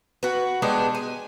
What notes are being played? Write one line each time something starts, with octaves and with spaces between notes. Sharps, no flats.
F#4 B4
G#3 B3 D4 G4
G#5